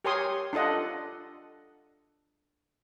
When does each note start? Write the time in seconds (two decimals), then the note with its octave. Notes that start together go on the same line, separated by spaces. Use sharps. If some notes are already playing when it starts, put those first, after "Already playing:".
0.04 G4 A#4 C#5 G#5 C6 D#6
0.53 D4 F4 A4 D#5 F#5